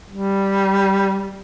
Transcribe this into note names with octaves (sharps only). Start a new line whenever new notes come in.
G3